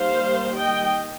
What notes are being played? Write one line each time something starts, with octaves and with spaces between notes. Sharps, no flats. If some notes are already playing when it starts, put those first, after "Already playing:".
Already playing: D#3 G3 A#3 C5 F5
D#5 G5